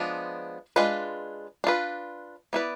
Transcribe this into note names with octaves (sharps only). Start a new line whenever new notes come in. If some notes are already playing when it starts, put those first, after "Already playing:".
Already playing: F3 G#3 B3 D4
G#3 D4 F4 B4
D4 F4 B4
B3 E4 B4 D5